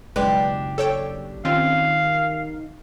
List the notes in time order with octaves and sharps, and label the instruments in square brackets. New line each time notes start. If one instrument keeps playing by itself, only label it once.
[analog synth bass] F#1 [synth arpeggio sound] B1 G#3 B4 [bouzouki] D4 G4
[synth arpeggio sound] A4 C#5 G5
[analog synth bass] D#3 [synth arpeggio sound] C4 C#4 F4 [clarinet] F5